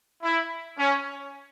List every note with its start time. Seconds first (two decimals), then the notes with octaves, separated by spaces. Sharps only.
0.23 E4
0.78 C#4